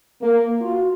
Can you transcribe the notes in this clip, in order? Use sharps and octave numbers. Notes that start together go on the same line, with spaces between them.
A#3
F4 F#4